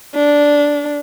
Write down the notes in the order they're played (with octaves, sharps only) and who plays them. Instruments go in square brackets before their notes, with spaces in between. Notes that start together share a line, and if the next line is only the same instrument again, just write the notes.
[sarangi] D4